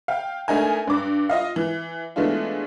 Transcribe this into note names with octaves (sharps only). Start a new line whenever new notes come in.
F5 G5
A3 D4 D#4 A#4 G#5
G2 D6
F4 D#5 F5
E3
E3 G#3 A3 B3 D4 F4